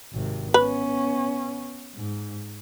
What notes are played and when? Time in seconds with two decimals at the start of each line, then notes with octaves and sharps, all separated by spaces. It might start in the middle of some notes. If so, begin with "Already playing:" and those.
0.13 G#1 C3
0.54 B3 C#4 B4
1.96 G#2